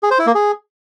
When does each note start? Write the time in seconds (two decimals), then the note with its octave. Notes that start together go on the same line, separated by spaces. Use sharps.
0.03 G#4
0.11 C5
0.19 E4
0.27 A#3
0.35 G#4